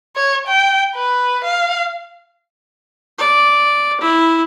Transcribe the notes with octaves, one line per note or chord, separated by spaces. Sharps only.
C#5
G5
B4
F5
D5
E4